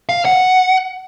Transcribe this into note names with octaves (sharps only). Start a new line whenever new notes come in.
F5
F#5